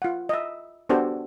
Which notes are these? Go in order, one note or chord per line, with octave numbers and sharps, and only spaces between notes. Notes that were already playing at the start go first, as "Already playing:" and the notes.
F4 F#5
D#5 E5
B3 D4 F#4 G4 A4 C5